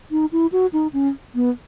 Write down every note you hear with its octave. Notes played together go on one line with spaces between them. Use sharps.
D#4
E4
F#4
D#4
C#4
B3